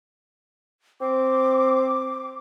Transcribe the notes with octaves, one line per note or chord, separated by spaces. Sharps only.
C4 D6